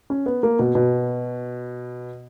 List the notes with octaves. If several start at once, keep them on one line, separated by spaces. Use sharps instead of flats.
C#4
B3
A#3
B2
B2